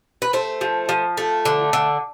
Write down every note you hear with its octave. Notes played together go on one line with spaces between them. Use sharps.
B4
A3 C5
F3
F3
A3
D3
D3